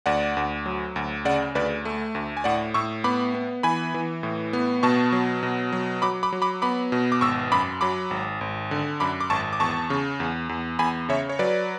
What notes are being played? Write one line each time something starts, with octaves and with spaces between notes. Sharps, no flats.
D2 D5 F#5
D2
F#3
D2
C#3 D5 F#5
D2 B4 D5
A3
D2
G#5
A2 D5 F#5
A2 C#6 E6
B3 B5 D6
B3
E3 G#5 B5
E3
A2
B3
B2 A5 C#6
F#3
B2
F#3
F#3 B5 D6
B5 D6
F#3
B5 D6
B3 B5 D6
B2
D6
G#1 C#6 E6
F#2 B5 D6
F#3 B5 D6
G#1
G#1
D3
F#2 B5 D6
D6
G#1 A5 C#6
D6
E2 A5 C#6
C#3
E2
E2
E2 G#5 B5
C#3 C#5 E5
C#5
F#3 B4 D5